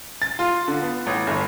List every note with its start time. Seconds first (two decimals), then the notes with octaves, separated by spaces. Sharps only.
0.22 A6
0.39 F4
0.68 D3
0.82 B3
1.07 A1
1.27 G1